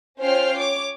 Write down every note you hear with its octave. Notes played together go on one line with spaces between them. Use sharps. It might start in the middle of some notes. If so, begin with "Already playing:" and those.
C#4 F4 C5 G5 F6 C7
C#5 D6